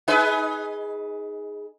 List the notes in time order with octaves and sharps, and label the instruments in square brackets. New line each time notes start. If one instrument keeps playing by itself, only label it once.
[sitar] D#4 G#4 B4